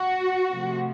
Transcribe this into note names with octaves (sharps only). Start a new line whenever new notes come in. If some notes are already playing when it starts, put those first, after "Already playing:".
Already playing: F#4
C3 F3 A3